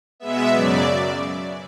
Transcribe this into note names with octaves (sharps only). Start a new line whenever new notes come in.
B2 G#3 B3 E5
F#2 C#3 F#3 D5